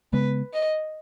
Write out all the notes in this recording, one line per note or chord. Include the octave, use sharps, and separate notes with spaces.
C#3 G#3 B3 B4
D#5